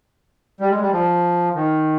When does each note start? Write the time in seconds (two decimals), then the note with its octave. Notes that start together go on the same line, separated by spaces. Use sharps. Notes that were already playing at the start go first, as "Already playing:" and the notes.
0.60 G3
0.70 G#3
0.81 G3
0.92 F3
1.55 D#3